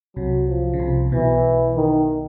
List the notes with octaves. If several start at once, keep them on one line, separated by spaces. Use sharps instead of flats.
C2 C3 F#3
F3
C#3
C2 C3
B1 B2 E3
D#3